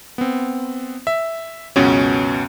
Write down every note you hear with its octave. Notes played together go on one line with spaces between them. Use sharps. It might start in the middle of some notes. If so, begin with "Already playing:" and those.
B3 C4
E5
C#2 F#2 B2 B3 C#4